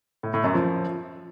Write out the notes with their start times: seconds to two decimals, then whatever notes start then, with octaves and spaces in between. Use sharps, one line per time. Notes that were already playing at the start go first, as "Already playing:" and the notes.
0.23 A2
0.34 A2
0.44 F#2
0.54 F3